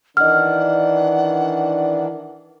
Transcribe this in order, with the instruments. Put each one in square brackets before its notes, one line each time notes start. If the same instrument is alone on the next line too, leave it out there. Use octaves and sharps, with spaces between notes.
[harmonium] D#3 E3 D4 [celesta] D#5 F6 [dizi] F#5